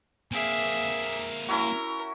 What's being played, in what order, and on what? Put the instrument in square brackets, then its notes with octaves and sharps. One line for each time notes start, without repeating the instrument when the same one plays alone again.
[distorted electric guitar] A#3 C4 [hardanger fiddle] G#4 E5
[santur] C#4 E4 F#4 [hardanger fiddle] A#4